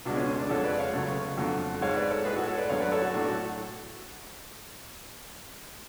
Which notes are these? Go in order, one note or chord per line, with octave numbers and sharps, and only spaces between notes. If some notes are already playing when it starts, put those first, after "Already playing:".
C#2 B2 G#3 D4 F#4
C#4 F4
C#4
D4
F2 D3 G#3 A4 C#5
B4 D5
C#5 F5
C#2 C#3 F#3 A3
F2 D3 F#3 A3
G#2 G#3 C#5 F5
B4 D5
A4 C#5
A2 G#3 G#4 B4
F#4 A4
A4 C#5
B4 D5
F#2 D3 F#3 A3 C#5 F5
B4 D5
A4 C#5
F#4 A4
A2 F#3 A3 D4 F#4
F#4 A4